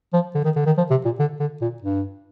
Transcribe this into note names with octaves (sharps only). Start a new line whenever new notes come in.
F3
D3
D#3
D3
D#3
F3
C3
A#2
D3
D3
A#2
G2